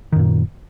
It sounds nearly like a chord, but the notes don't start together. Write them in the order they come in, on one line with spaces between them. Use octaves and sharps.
D#3 F#2 A#2